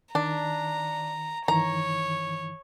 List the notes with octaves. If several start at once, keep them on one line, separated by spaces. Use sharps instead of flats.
D#3 D4 A#5
G2 D#3 E3 C#5 A#5